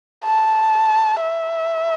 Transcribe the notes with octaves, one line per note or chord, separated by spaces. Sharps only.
A5
E5